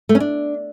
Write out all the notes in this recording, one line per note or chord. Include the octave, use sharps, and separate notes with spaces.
A3
C#4
D4